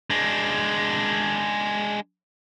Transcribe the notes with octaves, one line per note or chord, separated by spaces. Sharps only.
G#3 D4